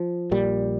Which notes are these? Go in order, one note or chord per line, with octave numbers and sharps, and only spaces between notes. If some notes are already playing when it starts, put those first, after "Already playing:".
Already playing: F3
A#1 A#2 G3